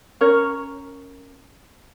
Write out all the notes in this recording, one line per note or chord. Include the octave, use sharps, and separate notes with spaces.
C#4 A#4 C#5